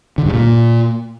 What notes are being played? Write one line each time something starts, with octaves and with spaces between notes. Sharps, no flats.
D3
G2
A#2